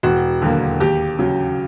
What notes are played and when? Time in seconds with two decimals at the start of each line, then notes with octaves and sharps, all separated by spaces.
0.03 E1 F#4
0.42 D#2 D3 F#3 A#3
0.80 D#2 G4
1.19 C#3 F#3